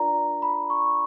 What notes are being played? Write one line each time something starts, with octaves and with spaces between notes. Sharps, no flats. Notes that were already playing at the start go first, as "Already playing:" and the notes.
Already playing: D4 F4 A#4 D5 A#5
B5
C#6